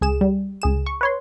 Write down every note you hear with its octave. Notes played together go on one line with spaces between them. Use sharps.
C#2 G#4 E7
G3
C#2 G#4 E7
C#6
B4 C#5 C6